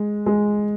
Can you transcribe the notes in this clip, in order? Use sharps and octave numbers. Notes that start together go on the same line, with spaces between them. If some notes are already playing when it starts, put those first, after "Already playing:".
Already playing: G#3
G#3